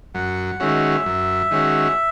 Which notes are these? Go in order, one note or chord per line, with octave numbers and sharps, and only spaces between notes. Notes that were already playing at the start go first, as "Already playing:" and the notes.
F#2 F#5
D#3 G#3 C#4 F#4 E5
F#2
D#3 G#3 C#4 F#4